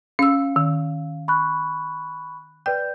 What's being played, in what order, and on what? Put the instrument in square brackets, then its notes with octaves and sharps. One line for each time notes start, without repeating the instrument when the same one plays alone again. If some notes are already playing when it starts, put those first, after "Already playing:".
[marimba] C#4 E6 [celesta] F5
[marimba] D#3
[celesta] B5 C#6 F#6
[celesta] B4 D5 G6 [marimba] G5